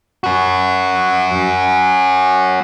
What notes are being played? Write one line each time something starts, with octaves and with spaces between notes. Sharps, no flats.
C#4 F#4